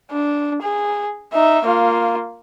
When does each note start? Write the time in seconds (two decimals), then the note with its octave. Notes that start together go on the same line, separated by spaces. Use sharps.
0.11 D4
0.62 G#4
1.33 D#4 E5
1.64 A#3 F4